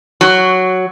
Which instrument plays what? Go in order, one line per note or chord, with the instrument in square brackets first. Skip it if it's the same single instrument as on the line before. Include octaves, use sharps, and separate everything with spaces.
[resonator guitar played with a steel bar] F#3